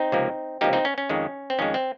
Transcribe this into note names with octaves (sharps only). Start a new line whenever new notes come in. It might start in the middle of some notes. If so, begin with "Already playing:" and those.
Already playing: C4 D#4
C#2 C3 F3 A#3
C#2 C3 F3 A#3 D#4 G4
C4 D#4
C#4
C#4
F2 D#3 G#3
C4
F2 D#3 G#3 C#4
C4